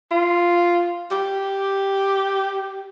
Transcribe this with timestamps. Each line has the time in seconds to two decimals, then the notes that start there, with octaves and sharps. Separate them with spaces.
0.11 F4
1.11 G4